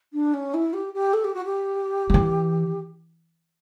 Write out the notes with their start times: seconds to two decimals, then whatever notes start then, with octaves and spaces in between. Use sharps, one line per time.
0.13 D4
0.34 C#4
0.54 E4
0.73 G4
0.94 G4
1.13 A4
1.24 G4
1.34 F#4
1.45 G4
2.10 F#3
2.14 E3